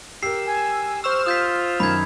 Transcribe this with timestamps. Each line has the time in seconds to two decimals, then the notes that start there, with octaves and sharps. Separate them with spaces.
0.23 G4 A#4 E6 C7
0.47 G#5
1.04 C5 C#6 E6 F6 E7
1.26 F4 D#6 G6 B6
1.80 F#2 D#3 B5 G#6